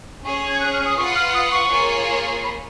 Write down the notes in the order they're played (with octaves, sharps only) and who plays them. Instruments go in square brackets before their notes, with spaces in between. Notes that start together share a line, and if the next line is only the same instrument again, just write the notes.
[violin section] C#4 G#4 C#5 [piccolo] C#6
[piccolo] G#6
F#6
F6
D#6
[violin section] F4 B4 F#5 [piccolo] C#6
[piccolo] F6
D#6
C#6
[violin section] A#3 F4 G#4 C#5
[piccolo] B5